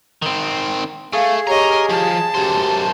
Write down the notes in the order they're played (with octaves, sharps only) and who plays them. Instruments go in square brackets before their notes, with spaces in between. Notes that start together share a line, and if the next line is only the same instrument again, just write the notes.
[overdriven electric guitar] D#3 C4
[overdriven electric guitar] A3 [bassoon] G#4 [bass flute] F5
[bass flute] G4 [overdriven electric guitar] A#4 A#5 [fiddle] C#5 D#5
[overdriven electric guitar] F3 [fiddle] A5
[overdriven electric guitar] F#2 C5 [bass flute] G4